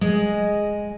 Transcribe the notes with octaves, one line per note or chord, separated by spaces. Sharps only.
G#3 D#5